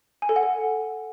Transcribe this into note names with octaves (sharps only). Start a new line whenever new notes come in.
G#5
A4
F#5
A4